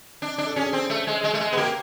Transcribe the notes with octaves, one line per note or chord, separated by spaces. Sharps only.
D4
D4
A4
C#4 G#4
C4
A3
G#3
G#3
A3
G#3
B3
A#3 G4